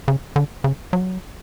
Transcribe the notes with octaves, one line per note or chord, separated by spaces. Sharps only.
C#3
D3
C#3
F#3